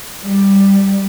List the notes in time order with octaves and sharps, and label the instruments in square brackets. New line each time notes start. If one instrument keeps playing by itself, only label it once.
[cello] G3